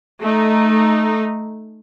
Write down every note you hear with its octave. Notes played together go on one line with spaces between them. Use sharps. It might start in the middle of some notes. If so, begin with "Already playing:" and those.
A3 D#4